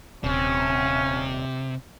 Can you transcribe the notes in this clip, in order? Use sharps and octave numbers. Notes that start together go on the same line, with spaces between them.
D#1 C3 C#4